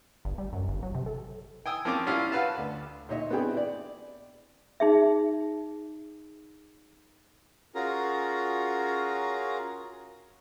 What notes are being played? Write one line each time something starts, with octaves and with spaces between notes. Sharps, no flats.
G1
G3
F#2
G1
F#3
C3
A4
G5 G#5 D#6 E6
F3 A#3 C4 C#4 D6
G3 C#4 E4 F4 F5 F6
F#4 B4 F5 A5
D2
A#2 D#4 C#5 D#5 E5
B3 C4 D4 E4 G#4 G5
D5
D#4 G#4 E5
C#4 F4 F#4 G#4 A#4 A#5